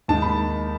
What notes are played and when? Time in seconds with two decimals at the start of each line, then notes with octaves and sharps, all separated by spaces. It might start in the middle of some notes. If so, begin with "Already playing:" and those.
0.08 D#2 D#3 G#3 D#4 A5
0.22 B5